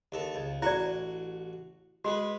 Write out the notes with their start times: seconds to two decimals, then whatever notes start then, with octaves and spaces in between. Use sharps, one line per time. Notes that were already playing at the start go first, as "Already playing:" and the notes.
0.12 D#2 A4
0.35 C#2
0.62 A1 E4 F#4 D5 F#5
2.05 G#3 F#4 B4